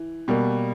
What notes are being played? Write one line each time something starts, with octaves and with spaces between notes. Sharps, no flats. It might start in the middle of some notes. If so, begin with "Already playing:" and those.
Already playing: E3
B2 G3 A#3